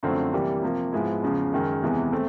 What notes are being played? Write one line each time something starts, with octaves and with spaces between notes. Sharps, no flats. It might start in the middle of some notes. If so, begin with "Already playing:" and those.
F#2 D3 F3 A3 C4
C3 E3 G3 A#3
C3 F3 A#3
G#2 F3 G#3 B3 E4
E2 C#3 F3 G#3
F#2 D#3 G#3
E2 C3 E3 G#3 B3
A3 C4